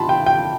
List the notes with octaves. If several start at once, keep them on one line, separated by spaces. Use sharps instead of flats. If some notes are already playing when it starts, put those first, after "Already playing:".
Already playing: A5 B5 C6
G5
G5